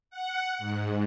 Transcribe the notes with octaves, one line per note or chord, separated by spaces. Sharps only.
F#5
G#2